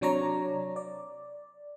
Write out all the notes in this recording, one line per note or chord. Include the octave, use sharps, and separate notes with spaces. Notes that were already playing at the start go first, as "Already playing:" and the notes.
C3 F#3 D4 C#5 D5 A#5
D5